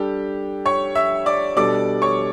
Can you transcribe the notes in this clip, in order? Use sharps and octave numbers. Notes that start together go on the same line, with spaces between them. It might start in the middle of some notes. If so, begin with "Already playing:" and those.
Already playing: G3 D4 G4 A4
C#5 C#6
E5 E6
D5 D6
B2 G3 D4 A4 D5 D6
C#5 C#6